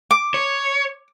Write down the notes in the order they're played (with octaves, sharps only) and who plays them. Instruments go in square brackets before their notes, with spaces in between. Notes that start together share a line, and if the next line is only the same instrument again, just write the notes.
[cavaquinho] D6
[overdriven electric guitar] C#5